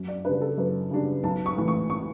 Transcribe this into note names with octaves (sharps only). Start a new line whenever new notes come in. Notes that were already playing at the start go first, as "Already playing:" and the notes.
Already playing: F#2
D5
C#3 G3 D4 B4
A4
F#2 B4
C#3 G3 D4
B1 A5
C#6
A2 E3
C#6
C#6